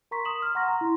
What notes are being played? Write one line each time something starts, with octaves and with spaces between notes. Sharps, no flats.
A#4 A#5 C6 C#6 B6
D#6 E7 F#7
F6
F#5 A#5 C6 C#6 A#6
A#5
E4 C6